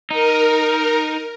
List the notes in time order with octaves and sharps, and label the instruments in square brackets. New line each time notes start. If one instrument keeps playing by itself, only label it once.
[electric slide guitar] D#4 [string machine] A#4